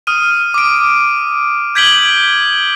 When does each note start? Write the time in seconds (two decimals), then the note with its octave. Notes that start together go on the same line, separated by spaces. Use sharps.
0.07 D#6 F6 D#7
0.54 D6 D7
1.75 G6 G#6 B6 D7 F#7 G7